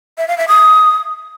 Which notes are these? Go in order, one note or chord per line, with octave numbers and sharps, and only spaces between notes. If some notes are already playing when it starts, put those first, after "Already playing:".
E5
F5
E5
D#6